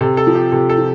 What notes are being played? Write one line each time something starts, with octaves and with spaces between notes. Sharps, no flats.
C3 A4
A4
F3
G4
C3 A4
A4
F3